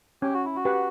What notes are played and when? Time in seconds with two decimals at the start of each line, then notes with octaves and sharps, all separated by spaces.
0.22 C#4 G4
0.34 F#4
0.45 E4
0.56 F#4
0.65 G4 B4 F#5